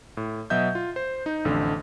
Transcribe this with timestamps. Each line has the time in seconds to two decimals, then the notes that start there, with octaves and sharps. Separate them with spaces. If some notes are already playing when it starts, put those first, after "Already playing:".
0.17 A2
0.50 B2 F#3 D#5 E5 G6
0.75 F4
0.96 C5
1.26 D#4
1.45 A1 F2 D3